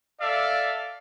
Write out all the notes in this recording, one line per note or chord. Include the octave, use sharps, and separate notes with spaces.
A4 D5 E5 F5